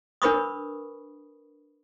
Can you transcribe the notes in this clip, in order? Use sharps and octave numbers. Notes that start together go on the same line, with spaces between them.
D4 A#4 B4 B5 C#6 D#6